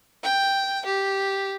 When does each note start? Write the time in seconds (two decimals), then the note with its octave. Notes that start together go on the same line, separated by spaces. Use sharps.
0.23 G5
0.85 G4